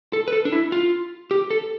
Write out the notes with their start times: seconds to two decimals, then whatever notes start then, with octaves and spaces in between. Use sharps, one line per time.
0.13 A4
0.28 B4
0.33 A4
0.45 D4
0.52 E4
0.72 F4
1.31 G4
1.51 A4